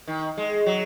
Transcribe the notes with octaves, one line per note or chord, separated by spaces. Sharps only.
D#3
G#3
F#3